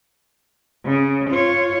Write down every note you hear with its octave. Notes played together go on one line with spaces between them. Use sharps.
C#3
F4 C#5